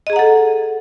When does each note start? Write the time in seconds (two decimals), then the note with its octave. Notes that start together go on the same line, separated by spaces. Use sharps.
0.07 D#5
0.10 G#4
0.13 A#5
0.16 F#5
0.19 A4